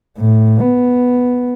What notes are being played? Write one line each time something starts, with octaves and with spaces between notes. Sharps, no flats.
A2
B3